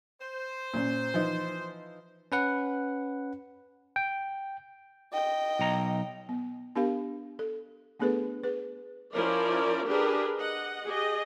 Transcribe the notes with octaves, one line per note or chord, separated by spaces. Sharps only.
C5
A#2 C#4
E3 F3 D#4
C#4 B4 F#5
G5
D#5 G5
B1 A#5
B3
B3 D4 G4 A#4 F5
A4
A3 B3 D4 G#4 A4 B4
G#4 B4
F3 C#4 E4 A#4 D5
D4 G4 G#4 A#4 B4
D#5 F#5
G4 G#4 D#5